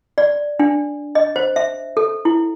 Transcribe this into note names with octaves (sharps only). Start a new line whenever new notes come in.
D5
D4
D#5
C5
E5
A4
E4